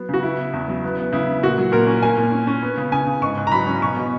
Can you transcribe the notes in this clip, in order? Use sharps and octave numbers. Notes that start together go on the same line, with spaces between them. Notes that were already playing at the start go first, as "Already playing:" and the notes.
Already playing: F#3 B3
C#3 F#4
B3 E4
B3
E2
F#3
B3
B3
C#3 E4
C#3
A#2 F#4
F#3
A#2 A#4
C#4
A#3 G#5
A#2
C#4
C#4
B3
C#3
C#3 G#5
C#3
G#2 C#6
G#2
A#5
F#3 B5
C#4
B2 C#6
B2